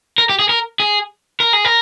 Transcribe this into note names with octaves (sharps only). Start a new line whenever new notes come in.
A#4
G4
G#4
A#4
G#4
A#4
G#4
A#4